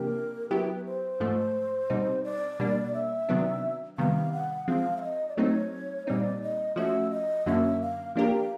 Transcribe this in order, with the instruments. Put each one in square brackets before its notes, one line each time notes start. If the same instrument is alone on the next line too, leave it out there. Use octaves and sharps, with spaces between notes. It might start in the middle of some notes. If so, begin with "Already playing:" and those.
Already playing: [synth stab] C3 F3 A#3 D4 G4 [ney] A#4
[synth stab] F#3 B3 E4 G4 [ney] B4
[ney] C5
[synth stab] G#2 F3 A3
B2 G3 C4 D#4
[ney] D5
[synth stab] B2 G3 A#3 D4
[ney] E5
[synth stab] C3 D#3 F#3 B3 D4
[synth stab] C3 D#3 G3 B3 [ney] F5
[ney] F#5
[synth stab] F3 G#3 C4 [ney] F5
[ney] E5
D#5
D5
[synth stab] F#3 A3 C4 D#4 [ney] C#5
[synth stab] A#2 G3 C4 D#4 [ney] D5
[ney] D#5
[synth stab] F3 A3 C#4 F#4 [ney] E5
[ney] D#5
[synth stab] F#2 D3 F#3 A#3 C#4 [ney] E5
[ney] F5
[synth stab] F3 A#3 D4 G4 A#4 [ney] F5